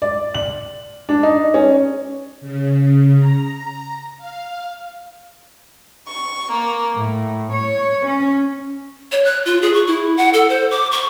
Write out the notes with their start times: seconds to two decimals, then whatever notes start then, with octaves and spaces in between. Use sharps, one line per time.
0.02 D5
0.34 F#7
1.09 D4
1.23 D#4
1.54 C#4
2.41 C#3
3.19 A#5
4.17 F5
6.06 C#6
6.51 A#3
6.96 A2
7.54 C#5
8.06 C#4
9.12 C#5
9.25 F#6
9.46 F4
9.62 G#4
9.74 C#6
9.87 E4
10.17 F#5
10.33 A4
10.49 C5
10.71 D6
10.92 C#6